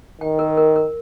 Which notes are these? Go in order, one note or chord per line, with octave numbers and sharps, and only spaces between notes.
D#3 G5
A#4
A#4
A#4